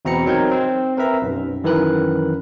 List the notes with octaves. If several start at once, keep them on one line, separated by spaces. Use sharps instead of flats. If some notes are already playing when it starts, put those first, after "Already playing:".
E2 B2 C4 A#5 B5 C#7
F#3 C4 D#4 A#4 G6 G#6
C4
C4 A#4 B4 E5 A#5
B1 F#2
F#2 D#3 E3 A#4 B4 F#6